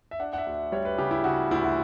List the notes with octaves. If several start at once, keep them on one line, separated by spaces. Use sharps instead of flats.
E5
D4 F#5
F#5
E5
D2
G3 C#5
B4
C#3 G4
E4
C#3 F#4
D2 E4
F#4